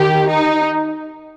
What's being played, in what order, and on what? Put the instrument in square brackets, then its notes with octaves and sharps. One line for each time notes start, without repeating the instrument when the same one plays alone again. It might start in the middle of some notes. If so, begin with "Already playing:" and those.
Already playing: [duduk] D#3 [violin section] G4
[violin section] D#4